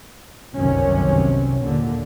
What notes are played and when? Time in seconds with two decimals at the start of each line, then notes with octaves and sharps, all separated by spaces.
0.57 G1 C2 F#2 C3 D#3 C#4
1.62 D#2 A#2 D3